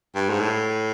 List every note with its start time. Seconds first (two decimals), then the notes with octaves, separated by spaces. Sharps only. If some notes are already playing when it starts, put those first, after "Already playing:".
0.15 G2
0.30 G#2
0.40 A2